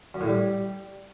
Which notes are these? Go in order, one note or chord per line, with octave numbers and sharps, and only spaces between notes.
F#2
A2
G3